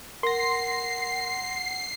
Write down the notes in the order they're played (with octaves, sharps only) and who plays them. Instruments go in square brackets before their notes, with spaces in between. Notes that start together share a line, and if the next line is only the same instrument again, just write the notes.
[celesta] A#4 [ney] F#5 [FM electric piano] C6 A#6 [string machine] C7